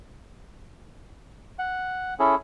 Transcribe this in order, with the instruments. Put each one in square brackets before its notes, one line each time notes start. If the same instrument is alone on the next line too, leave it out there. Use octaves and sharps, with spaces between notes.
[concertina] F#5
C#4 E4 G#4 A4